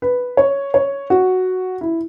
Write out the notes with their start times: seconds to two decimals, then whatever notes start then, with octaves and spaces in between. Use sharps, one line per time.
0.02 B4
0.37 C#5
0.74 C#5
1.10 F#4
1.81 E4